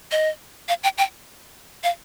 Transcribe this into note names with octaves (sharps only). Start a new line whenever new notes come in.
D#5
F5
G5
G5
F5